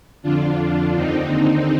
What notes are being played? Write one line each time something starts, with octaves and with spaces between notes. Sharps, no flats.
F2 D3 D4 F4
D4 F4
D#2 D3 C4 D#4